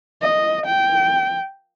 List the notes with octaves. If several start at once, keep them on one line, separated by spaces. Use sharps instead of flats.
D#5
G5